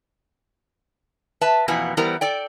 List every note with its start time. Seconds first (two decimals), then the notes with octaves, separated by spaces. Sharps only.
1.41 B4 E5 A5
1.68 F2 B2 E3 A#3 B3 G#5
1.97 E3 G3 B3 A#4 C5 A#5
2.21 A4 D5 G5